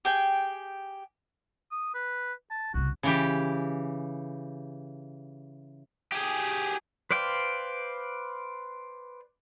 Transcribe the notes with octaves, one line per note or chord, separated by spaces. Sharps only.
G4 G#4 G5 G#5
D#6
B4
A5
C2 C#3 F#4
C#3 E3 G4
G4 G#4
B4 C5 D5 F5 G5